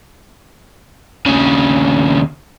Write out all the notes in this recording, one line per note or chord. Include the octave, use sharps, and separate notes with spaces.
D#2 C#3